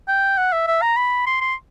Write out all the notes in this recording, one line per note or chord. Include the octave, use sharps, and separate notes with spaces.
G5
F#5
E5
E5
A#5
B5
C6
C6